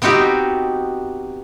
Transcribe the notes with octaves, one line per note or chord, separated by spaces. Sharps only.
B3 C4 D#4 F#4 G4